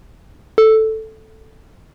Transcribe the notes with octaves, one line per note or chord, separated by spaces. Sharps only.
A4